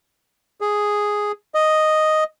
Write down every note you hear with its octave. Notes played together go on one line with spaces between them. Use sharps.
G#4
D#5